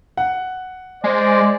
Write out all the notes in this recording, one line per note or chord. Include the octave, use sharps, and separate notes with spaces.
F#5
G#3 C5 D5